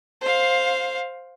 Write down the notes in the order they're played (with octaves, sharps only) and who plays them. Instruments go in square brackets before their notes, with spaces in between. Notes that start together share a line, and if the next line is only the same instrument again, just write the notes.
[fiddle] C5 F5